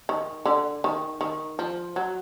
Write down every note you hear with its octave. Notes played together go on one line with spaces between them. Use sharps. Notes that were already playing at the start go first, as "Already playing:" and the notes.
D#3
D3
D#3
D#3
F3
F#3